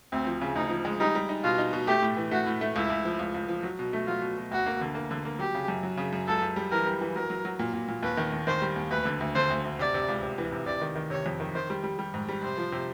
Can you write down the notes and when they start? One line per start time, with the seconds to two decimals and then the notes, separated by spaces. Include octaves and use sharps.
0.12 D2 C4
0.27 F3
0.41 C#3
0.56 D2 D#4
0.70 F3
0.85 G#3
1.00 G3 D#4
1.15 G3
1.29 D#4
1.44 B2 F4
1.58 D#4
1.73 B2
1.87 A3 G4
2.02 A2
2.17 E3
2.31 A3 F#4
2.46 A2
2.61 A3
2.76 C#2 E4
2.90 C#2
3.05 F3
3.19 C#2
3.35 C#2
3.49 F3
3.63 F#3
3.79 B2
3.93 A3
4.07 F#3 F4
4.22 B2
4.37 B2
4.51 D2 F#4
4.66 A#3
4.81 D3
4.95 A#3
5.11 D3
5.25 A#3
5.39 F#3 G4
5.55 C#3
5.68 F#2
5.83 F#3
5.97 C#3
6.13 F#2
6.27 C#2 A4
6.42 C#2
6.56 G3
6.71 E3 A#4
6.86 G3
7.01 E3
7.15 F#3 A#4
7.30 F#3
7.45 F#3
7.59 A#2
7.73 A#2
7.88 A#2
8.03 D#2 B4
8.17 D#3
8.32 D#2
8.47 D#3 C5
8.62 G3
8.76 D#2
8.91 D2 B4
9.05 D3
9.20 D2
9.35 D3 C5
9.50 D2
9.64 D2
9.79 C3 D5
9.94 C3
10.08 C#2
10.23 C3
10.38 E3
10.52 C3
10.66 C3 D5
10.81 D#3
10.96 D#3
11.10 C3 C#5
11.26 F2
11.40 D#3
11.55 D#3 C5
11.70 G3
11.84 G3
11.99 G3
12.14 G#2
12.29 G3
12.43 C3 C5
12.58 F3
12.72 C3